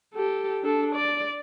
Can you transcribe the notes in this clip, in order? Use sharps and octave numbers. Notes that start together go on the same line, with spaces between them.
G4 A4
D4 A4
D5